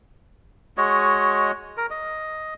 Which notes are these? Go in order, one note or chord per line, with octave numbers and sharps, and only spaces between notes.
G#3 F#4 C#5 D#5
A#4
D#5